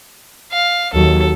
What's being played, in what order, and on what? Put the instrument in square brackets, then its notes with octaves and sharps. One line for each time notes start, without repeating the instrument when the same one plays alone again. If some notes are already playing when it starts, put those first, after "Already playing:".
[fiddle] F5
[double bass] D#2 F#3 [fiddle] A4